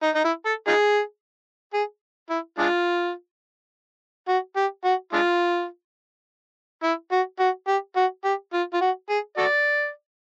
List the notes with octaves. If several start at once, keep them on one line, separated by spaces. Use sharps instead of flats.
D#4
D#4
E4
A4
D#4 F4 G#4
G#4
E4
G#3 D4 F4
F#4
G4
F#4
G#3 D4 F4
E4
F#4
F#4
G4
F#4
G4
F4
F4
F#4
G#4
F#4 A4 D5